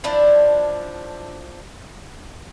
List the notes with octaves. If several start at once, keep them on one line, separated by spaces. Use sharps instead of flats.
F3 D4 E4